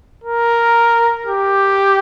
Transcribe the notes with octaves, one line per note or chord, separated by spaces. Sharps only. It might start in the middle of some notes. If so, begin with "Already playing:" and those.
A#4
G4